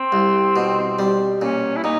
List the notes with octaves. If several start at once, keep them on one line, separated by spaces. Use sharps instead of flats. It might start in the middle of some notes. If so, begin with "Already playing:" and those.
Already playing: C4
C2
B2
G3
A#2 C#4
E4
A#2 D#4